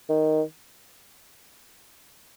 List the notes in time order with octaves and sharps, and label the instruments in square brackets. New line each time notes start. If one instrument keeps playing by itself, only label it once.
[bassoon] D#3